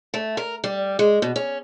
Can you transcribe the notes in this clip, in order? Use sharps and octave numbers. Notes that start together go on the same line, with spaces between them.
A3
A#4
G3
G#3
B2
C#4